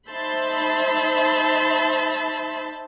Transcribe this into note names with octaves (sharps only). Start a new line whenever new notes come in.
D#4 C5 E5 A5 B5 C6